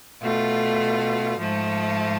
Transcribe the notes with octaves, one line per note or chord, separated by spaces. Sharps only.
B2 A3 F4
G#2 F3 A3